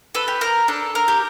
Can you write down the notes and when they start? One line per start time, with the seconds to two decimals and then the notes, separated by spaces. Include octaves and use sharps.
0.15 A4 B4
0.28 G4
0.41 A#4
0.68 D4 A4
0.95 A#4
1.08 G4